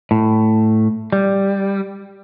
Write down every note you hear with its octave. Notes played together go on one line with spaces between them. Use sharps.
A2
G3